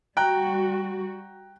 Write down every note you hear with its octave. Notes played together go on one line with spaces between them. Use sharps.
G3 F#4 G5 A#5 F#6